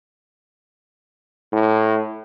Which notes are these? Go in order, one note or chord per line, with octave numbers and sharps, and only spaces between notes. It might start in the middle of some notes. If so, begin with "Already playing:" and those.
A2